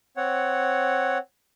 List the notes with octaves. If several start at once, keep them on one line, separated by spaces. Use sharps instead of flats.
C4 C#5 F#5